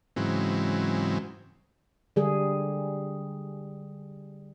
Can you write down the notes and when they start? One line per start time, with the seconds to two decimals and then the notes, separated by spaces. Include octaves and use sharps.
0.16 G#2 C#3 E3 F#3 C4
2.16 D3 G3 G#4